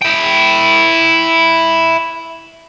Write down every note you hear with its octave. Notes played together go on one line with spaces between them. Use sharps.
E4 G5